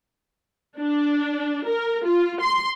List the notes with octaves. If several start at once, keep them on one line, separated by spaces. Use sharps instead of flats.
D4
A#4
F4
C6